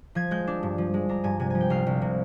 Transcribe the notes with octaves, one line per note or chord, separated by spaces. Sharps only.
F3 G#6
G#3 G6
D4
G2
F3
G#3
D4 A#5
G2 G#5
C3 G#5
F3 G#5
G5
C2 F5
C2
C3